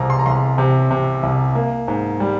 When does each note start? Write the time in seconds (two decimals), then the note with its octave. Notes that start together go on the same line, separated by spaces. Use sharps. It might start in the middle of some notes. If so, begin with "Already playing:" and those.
Already playing: C2 C3 A#5
0.10 C6
0.19 A#5
0.26 C2 C6
0.58 C3
0.91 C3
1.23 C2
1.55 A#3
1.88 G#2
2.20 G3